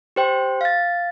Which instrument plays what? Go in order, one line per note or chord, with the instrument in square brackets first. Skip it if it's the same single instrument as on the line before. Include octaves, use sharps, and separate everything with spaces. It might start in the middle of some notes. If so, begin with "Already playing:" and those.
[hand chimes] G4 C5 G5
F5 A6